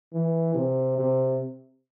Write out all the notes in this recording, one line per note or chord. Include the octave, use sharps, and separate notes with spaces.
E3
C3
C3